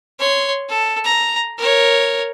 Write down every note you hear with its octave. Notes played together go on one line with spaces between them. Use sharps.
C#5 C6
A4
A#5
A#4 C#5